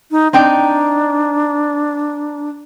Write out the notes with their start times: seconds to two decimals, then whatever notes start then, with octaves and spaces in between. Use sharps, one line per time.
0.11 D#4
0.33 C4 D4 D#4 G5